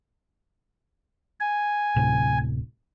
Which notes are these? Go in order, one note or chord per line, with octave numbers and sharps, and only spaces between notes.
G#5
D1 A2 C3